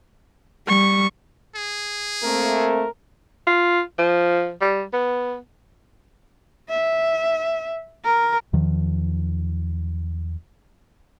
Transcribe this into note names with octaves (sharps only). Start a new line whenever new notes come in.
G3 C#6
G#4
A3 A#3 C4 A#4
F4
F3
G3
B3
E5
A#4
E2 D#3 F3